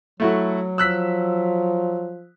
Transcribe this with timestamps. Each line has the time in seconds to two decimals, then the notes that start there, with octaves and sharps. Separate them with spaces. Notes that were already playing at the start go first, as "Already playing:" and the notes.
0.20 F#3 A3 E4 F#4
0.78 F3 E6 F#6 B6